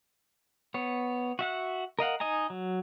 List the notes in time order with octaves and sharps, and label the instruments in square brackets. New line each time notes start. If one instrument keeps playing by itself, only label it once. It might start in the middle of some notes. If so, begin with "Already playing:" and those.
[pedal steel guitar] B3 C#5
F#4 E5 F#5
A#4 D#5 F5 F#5
D#4 D#5 G#5 A#5
F#3